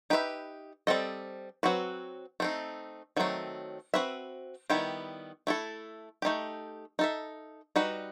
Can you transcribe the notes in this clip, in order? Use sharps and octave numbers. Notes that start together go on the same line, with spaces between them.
D#4 G4 B4 E5
G3 C4 F#4 A4 D#5
F#3 C4 F#4 B4
A3 C4 D#4
D#3 F#3 A3 C4
C4 F#4 B4 E5
D#3 G3 B3 E4 G4
A3 E4 A4
A3 D#4 G4
D#4 A4 E5
G3 D#4 F#4 B4